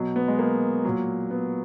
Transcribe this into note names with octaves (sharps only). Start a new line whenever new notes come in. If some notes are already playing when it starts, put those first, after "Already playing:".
Already playing: B2 F#3
B3
G#3
A#3
A#2 F#3
B3